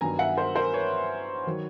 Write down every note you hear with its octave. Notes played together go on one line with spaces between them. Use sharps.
G2 D#3 F#3 B3 G#5 A#5
E5 F#5
A#4 C5
A#4 C5
B4 C#5
D#3 F#3